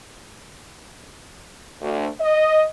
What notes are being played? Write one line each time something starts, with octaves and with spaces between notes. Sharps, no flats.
D2
D#5